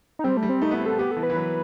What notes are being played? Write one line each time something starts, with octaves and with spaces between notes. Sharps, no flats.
D#4
G3 C4
A3
G3
C4
A3 D#4
B3
E4
C4
B3 A4
B3 G4
A4
E3
B4
E3
F#3